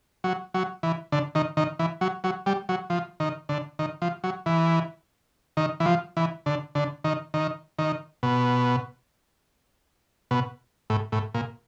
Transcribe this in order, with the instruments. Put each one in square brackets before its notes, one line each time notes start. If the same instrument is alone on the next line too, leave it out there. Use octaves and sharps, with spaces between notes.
[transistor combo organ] F#3
F#3
E3
D3
D#3
D#3
E3
F#3
F#3
G3
F#3
F3
D#3
D3
D#3
F3
F#3
E3
D#3
E3
F3
E3
D3
D3
D#3
D#3
D#3
B2
B2
A2
A2
A#2